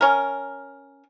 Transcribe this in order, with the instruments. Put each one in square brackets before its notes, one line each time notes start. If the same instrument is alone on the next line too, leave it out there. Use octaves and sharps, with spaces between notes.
[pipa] C#4 A#4